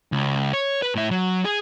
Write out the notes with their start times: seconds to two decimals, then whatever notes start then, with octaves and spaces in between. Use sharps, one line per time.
0.12 C#2
0.53 C#5
0.82 B4
0.95 A2 E5
1.11 F#3
1.45 G#4